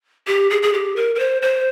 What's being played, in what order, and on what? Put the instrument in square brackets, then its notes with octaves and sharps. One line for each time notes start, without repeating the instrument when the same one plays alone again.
[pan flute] G4
G#4
G#4
G4
A#4
A#4
C5
C5